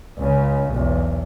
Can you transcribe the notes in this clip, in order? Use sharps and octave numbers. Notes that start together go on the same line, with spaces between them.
C#2 C#3
B1 E2